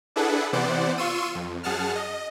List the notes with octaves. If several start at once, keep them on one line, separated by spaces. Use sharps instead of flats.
D4 E4 G#4 A4 B4 F#5
C3 E3 B3 C5 D5 F#5
F4 C6 C#6 E6 D#7
F2
F#2 G#4 F#5 A5 F6
D#5